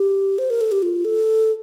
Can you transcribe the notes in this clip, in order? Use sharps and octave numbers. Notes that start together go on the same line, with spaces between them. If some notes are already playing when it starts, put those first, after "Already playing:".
Already playing: G4
C5
A#4
A4
G4
F4
A4